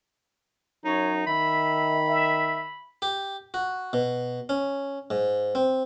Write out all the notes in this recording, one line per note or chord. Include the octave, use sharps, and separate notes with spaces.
F#2 D#4 C#5
D#3 E5 B5
E5
G4
F#4
B2
C#4
G#2
C4